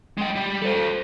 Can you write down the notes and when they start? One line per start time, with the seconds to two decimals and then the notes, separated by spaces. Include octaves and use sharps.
0.18 G#3 G5
0.36 G3
0.62 A4 C5